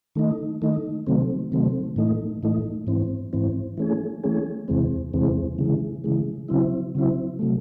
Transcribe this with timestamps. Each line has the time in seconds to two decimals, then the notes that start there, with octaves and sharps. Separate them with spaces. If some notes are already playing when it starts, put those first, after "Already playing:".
0.16 D#3 A3 D#4
0.62 D#3 A3 D#4
1.07 C3 D#3 F#3 A3 C4
1.52 C3 D#3 F#3 A3 C4
1.96 A2 E3 A3 D#4
2.43 A2 E3 A3 D#4
2.87 G#2 E3 C4
3.33 G#2 E3 C4
3.78 E3 A3 C#4 G#4
4.24 E3 A3 C#4 G#4
4.68 E2 C3 E3 G#3 C4
5.14 E2 C3 E3 G#3 C4
5.59 C#3 E3 G#3
6.04 C#3 E3 G#3
6.49 C#3 F#3 C4 E4
6.95 C#3 F#3 C4 E4
7.39 C3 F#3 A3